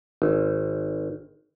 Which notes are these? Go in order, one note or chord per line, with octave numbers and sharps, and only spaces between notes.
G#1